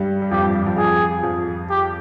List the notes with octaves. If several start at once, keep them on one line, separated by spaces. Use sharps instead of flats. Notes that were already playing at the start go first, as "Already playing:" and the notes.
Already playing: G2 G3
G3
F2 F3 G4
G2 G3
G2 G3
F2 F3
F2 F3 G#4
F2 F3
G4